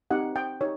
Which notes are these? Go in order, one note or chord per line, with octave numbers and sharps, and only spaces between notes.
C4 D#4 G4 F#5
G5
D#4 G4 C#5